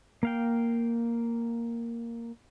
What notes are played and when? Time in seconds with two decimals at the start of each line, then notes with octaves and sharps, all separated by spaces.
0.23 A#3 F5 G5